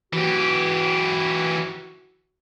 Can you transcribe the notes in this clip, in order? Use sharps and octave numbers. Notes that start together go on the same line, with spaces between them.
E3 F#4 G4